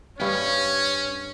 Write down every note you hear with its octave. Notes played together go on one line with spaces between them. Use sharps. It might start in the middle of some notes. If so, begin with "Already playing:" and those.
G2 C#4 C#5 G5